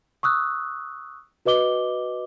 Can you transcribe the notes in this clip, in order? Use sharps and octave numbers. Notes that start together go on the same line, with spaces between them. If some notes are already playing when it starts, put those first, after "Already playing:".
C#6 D#6 E6 F#6
F#4 B4 D#5 D6 G7